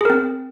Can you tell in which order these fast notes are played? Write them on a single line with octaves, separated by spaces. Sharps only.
G#4 A#4 C4